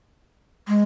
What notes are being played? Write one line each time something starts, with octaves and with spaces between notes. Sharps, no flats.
G#3